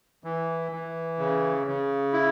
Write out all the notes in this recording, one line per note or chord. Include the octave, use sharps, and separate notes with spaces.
E3
E3
C#3
C#3
E4